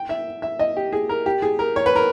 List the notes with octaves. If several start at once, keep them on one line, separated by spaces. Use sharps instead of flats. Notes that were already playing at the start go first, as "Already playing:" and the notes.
Already playing: G5
E5
E5
D#5
G4
G#4
A#4
G4
G#4
A#4
C#5
B4
A#4